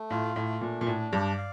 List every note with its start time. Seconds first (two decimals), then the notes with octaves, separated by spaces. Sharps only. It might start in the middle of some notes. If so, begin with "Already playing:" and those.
Already playing: A3
0.10 A2 F4
0.36 A2 A3
0.61 A#2 D4
0.81 A#2
0.87 A2 D4
1.13 G2 D5
1.38 F5